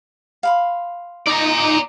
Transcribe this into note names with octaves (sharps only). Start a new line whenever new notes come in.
F5 B5 C6
D#4 D5 A#5